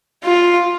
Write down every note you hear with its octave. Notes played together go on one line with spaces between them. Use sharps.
F4